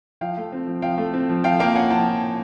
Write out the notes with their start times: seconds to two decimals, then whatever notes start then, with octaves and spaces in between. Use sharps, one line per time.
0.21 F3 F5 G5
0.37 A3
0.52 C4
0.67 F3
0.82 F3 F5 G5
0.98 A3
1.14 C4
1.29 F3
1.44 F3 F5 G5
1.59 A#3 F5 G5
1.75 C#4 F#5 G#5
1.90 F3 G5 A5